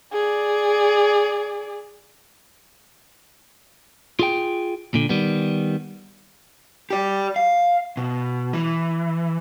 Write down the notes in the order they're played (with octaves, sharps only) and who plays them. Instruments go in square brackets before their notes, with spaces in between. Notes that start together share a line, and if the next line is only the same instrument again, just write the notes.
[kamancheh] G#4 D5
[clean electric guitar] F4 G#4 G5
A#2 D3
D#3 G3 B3
[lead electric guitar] G4 D5
F5
B2
E3